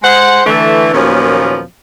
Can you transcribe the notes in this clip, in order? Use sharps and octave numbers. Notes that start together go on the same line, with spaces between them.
G#3 C5 F#5
D3 E3 A3
D#2 A#2 F3 F#3 B3 C#4